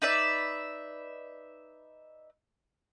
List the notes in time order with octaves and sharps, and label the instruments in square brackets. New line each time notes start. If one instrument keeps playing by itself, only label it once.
[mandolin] D#4 B4 D5 E5